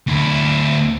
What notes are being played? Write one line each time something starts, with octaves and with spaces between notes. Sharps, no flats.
D2 E4